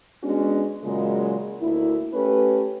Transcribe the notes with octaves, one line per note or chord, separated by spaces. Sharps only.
G#3 B3 C#4 D4 F#4
A#2 C#3 F#3 G#3
D2 A#3 E4
A3 C#4 G4 B4